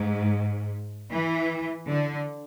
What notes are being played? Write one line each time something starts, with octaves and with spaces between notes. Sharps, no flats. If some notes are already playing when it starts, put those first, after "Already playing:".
Already playing: G#2
E3
D3